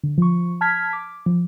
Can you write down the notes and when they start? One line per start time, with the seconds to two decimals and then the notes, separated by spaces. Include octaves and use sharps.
0.04 D3
0.18 F3 C#6
0.61 A5 F6 G#6 B6
0.93 D6
1.26 F3